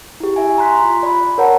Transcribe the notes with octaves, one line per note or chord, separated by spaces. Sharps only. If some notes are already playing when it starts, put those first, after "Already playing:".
E4 G4
E5 G#5
A#5 C6 F#6 B6
F4
D5 B5
A#4 C5 C#5 F#5 A5 A#5